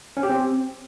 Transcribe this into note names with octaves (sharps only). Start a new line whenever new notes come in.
C#4
G4
C4